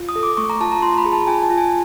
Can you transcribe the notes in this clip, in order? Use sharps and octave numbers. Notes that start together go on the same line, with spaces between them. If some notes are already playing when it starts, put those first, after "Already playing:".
Already playing: F4
D#6
A4
D6
A3 C#6
A#5
F4 A5
A#5
F4 C6
B5
G#4
A5
F4 G#5
A5
F4
G#5